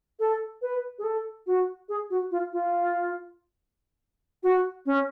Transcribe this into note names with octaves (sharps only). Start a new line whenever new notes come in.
A4
B4
G#4
A4
F#4
G#4
F#4
F4
F4
F#4
C#4